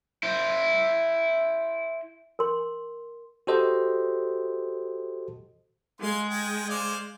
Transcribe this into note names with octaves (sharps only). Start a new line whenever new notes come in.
E4 C5
A#4 C6
F#4 G4 A4 C5 D#5
G#3 F5 C6
D#5 G5
C5 D5 F5